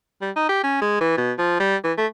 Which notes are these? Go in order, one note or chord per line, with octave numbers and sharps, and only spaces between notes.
G3
D#4
G4
C#4
G#3
E3
B2
F3
G3
E3
A3